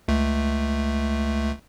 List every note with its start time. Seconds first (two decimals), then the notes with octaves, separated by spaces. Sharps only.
0.08 C#2 A3